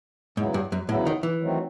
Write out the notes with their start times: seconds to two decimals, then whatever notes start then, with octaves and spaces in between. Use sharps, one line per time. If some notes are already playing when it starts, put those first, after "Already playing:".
0.37 E2 G#2 C#3 F#3 B3 E4
0.54 G2
0.72 F#2
0.89 E2 A2 C#3 F#3 B3 E4
1.06 D#3
1.23 E3
1.40 D#3 F#3 A3 C4